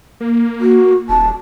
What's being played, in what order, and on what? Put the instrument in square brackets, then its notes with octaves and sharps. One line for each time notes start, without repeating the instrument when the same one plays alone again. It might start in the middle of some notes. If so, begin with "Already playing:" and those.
[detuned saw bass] A#3
[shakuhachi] F#4
[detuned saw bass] D#1 [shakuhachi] A5